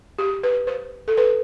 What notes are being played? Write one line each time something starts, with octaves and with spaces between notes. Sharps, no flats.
G4
B4
C5
A4
B4